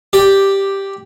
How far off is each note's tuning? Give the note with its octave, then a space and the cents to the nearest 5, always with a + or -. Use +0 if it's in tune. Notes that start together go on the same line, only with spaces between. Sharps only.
G4 +0 D5 +5